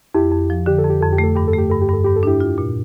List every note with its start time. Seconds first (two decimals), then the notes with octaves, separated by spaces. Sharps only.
0.14 F2 E4 G4
0.31 F2
0.50 F3
0.66 D3 G4
0.78 A4
0.85 F2 G4
1.01 F2 A4
1.12 G4
1.18 A3
1.24 A4
1.35 G2 G4
1.48 A4
1.54 A3 G4
1.70 G2 A4
1.81 G4
1.89 G2 A4
2.04 G2 G4
2.16 A4
2.23 D4 E4 G4
2.40 F4
2.58 A#2